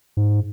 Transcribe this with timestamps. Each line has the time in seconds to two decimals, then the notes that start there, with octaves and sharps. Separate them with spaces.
0.17 G#2